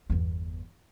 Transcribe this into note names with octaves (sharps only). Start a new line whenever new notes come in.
G1 E2